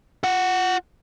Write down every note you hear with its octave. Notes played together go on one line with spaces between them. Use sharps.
F4 F#5